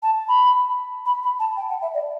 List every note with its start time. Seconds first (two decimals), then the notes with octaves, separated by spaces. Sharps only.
0.03 A5
0.28 B5
1.06 B5
1.23 B5
1.40 A5
1.57 G5
1.69 F#5
1.82 E5
1.94 D5